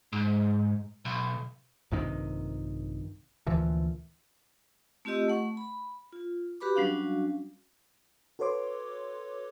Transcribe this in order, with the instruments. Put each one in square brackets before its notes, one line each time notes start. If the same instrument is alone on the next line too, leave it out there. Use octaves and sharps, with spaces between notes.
[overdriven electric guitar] G#2
B1
[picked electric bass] A#1 G2 C3 D#3
D2 A#2 E3 F3
[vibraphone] A3 C4 F4 G4 D#5 E6
A3 F#5 C#6
B5
F4
F#4 G4 B4 B5 D6
F#3 G3 C#4 D4 F#4 F5
[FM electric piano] F#4 A4 B4 C#5 C6 D6